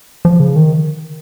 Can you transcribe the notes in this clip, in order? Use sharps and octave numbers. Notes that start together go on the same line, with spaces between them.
F3
C#3
D#3